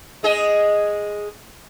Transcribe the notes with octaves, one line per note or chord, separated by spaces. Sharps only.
G#3 G#4 D#5